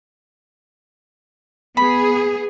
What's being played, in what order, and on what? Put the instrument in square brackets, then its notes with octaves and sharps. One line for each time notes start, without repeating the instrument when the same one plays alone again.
[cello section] B3 G#4 [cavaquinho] B5